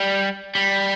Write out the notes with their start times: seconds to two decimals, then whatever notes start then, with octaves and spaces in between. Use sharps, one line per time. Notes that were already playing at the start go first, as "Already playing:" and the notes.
Already playing: G3
0.55 G3